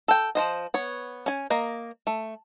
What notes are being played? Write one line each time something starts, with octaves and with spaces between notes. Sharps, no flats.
A4 G5
F3 C5 D#5
B3 C#5
C#4 G#5
A#3 D#5
A3